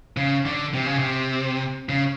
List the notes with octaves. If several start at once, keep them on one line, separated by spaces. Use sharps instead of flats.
C#3
D3
C3
C#3
C3
C#3